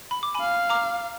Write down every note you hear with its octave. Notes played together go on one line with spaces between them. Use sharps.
B5
D6
G#5 B5
F5
A#5 D6